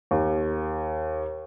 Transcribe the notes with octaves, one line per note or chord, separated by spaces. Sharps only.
D#2